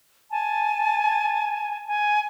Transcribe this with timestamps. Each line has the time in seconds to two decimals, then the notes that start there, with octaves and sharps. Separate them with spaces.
0.30 G#5 A5
1.87 G#5